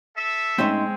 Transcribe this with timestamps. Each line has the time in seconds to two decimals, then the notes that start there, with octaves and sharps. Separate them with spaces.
0.17 A4 E5
0.58 A2 G#3 C4 C#4 D#4